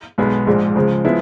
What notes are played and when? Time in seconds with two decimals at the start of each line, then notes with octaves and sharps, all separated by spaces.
0.18 B1 B2 G#3 B3
0.47 A#1 G#2 F3 G#3
0.75 C#2 C#3 F3 G#3
1.05 F3 G#3 B3 E4